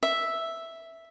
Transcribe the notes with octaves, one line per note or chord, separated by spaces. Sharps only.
E5